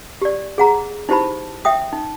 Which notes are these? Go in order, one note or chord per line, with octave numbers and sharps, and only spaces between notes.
G4 D5
G#4 F#5 A#5
D#4 E4 G4 C5 A5 B5
E5 G5 D#6
D#4